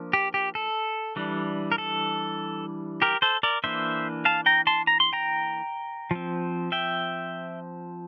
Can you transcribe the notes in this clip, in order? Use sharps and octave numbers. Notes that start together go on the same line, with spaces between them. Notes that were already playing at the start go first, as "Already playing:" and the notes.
Already playing: F3 A#3 D4
G4
G4
A4
E3 G3 D4
A#4
A4
G4 A#4
A4 C5
A#4 D5
E3 A#3 D4 C5 E5
F5 A5
G5 A#5
A5 C6
A#5
C6
G5 A#5
F3 C4
E5 G5